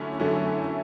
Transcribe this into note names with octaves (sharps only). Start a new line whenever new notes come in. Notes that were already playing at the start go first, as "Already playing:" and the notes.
Already playing: D3 F#3 A3 C#4 E4
D3 F#3 A3 C#4 E4